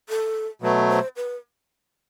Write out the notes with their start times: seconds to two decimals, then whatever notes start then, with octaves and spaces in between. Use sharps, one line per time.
0.09 A4
0.62 B2 F#3 A3 B4
0.89 C5
1.16 B4